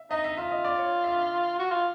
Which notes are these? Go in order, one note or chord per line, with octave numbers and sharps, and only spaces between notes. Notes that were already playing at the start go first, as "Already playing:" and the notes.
Already playing: E5
D#4 D#5
E5
F4 E5
D#5
D5
C#5
E5
E5
F#4
F4